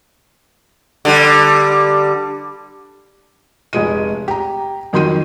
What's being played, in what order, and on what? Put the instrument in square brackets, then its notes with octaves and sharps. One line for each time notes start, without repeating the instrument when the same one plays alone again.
[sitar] D3 G3
[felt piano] F1 G#3 D#7
G4 A#5
F2 D#3 F#3 C6 G6 D#7